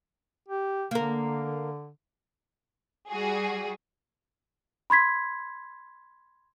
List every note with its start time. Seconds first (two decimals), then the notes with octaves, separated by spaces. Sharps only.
0.48 G4
0.91 D3 A#3 A#4
3.10 G3 F#4 G#4
4.90 B5 C6 G#6 B6